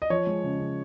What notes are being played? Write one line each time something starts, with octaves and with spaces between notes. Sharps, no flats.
D#5
F3 C#5
G#3
C#3
C#3